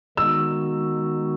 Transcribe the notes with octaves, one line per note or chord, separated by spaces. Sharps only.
D#3 G#3 B3 D#4 F#4 E6